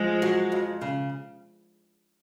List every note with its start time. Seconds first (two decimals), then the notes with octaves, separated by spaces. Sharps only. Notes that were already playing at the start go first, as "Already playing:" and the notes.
Already playing: F3 G#3
0.22 F#3
0.52 F2
0.81 C#3